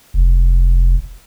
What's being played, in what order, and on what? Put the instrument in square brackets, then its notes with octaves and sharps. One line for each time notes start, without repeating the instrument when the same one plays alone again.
[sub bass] F1